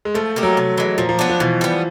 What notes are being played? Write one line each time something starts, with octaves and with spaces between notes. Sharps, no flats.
G#3
F3 A3
A#3 D#4 G4
F#3
C3
E3 G#3
A#2 F3
F3
F#3 B3 D4
F3
B2 E3
G3 B3